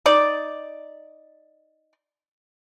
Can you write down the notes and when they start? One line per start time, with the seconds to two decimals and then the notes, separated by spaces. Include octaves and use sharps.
0.06 D#4 D5